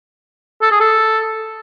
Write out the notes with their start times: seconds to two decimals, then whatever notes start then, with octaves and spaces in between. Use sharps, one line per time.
0.62 A4
0.72 G#4
0.80 A4